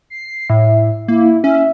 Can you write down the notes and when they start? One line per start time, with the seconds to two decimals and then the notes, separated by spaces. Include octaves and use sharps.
0.10 C7
0.50 A2 E5
1.08 A#3 E4
1.44 C#4 E5